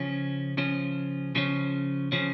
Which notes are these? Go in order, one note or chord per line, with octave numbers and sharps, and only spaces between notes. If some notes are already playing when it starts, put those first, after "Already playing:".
Already playing: C#3 F3 C#4
C#3 F3 C#4
C#3 F3 C#4
C#3 F3 C#4